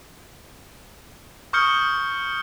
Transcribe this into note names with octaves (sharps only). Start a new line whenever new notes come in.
C#6 D#6 F6 G6 C#7 G7